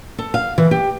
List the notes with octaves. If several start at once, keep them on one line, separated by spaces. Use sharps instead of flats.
A4
F5
E3
G4